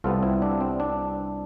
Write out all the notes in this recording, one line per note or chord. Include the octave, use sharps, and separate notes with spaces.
C2 C3 G3 B3 F4 A4
C4 E4
D4
C4
D4